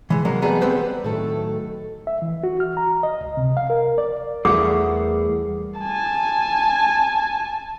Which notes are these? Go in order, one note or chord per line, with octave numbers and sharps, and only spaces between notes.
E3 G#3
C3 F#3 G#3 A#3
F2 G3 A3 B3 G#4 A#5
B3 C4 G4 B4 C5
A2 D#3 F#3 A3 A4
E5
E3
F#4
F6
A#5
D#5
C#2
C3
F5
A#4
D5
E2 G3 A3 G#4 A#4 F#5 D6
G#5 A5